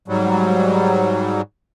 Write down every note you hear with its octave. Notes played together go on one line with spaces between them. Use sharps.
G#2 F#3 G3